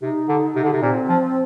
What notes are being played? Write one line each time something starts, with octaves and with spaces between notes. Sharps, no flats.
C3 D#4
D3
C3
D3
C3
A#2 C4
F3